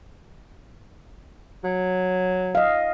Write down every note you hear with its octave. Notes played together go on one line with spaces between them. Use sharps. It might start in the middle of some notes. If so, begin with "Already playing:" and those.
F#3
D#5 F5